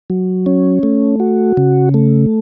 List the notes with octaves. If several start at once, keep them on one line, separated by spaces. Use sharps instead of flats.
F#3
C#4
A3
F#4
C#3
A3